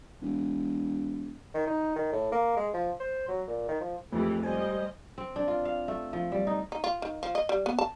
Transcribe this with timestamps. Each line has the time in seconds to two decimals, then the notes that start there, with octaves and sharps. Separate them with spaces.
0.22 E1
1.54 D#3
1.67 D#4
1.96 D#3
2.12 A2
2.32 A#3
2.56 G#3
2.74 F3
3.00 C5
3.28 F#3
3.47 A#2
3.68 D#3
3.80 F3
4.13 F2 E3 G#3 A3 G4
4.43 G3 C5 D#5 G#5
5.18 C4
5.36 D4
5.48 F4
5.65 F5
5.88 A3
6.13 F3
6.32 G3
6.47 D#4
6.72 D#4
6.84 F4
7.02 D#3
7.23 F3
7.35 D#5
7.49 G3
7.66 B3
7.79 A5